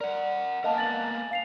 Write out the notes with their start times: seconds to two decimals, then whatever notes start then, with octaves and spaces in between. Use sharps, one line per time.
0.01 A#4 D5 F#5
0.64 A#3 B3 A#4 D#5 F5 A5
0.76 G#5 A6 F#7
1.31 F5 C7 F7